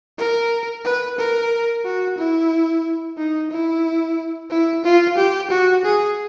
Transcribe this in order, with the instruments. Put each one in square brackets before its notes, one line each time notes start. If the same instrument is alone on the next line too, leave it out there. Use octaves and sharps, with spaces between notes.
[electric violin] A#4
B4
A#4
F#4
E4
D#4
E4
E4
F4
G4
F#4
G#4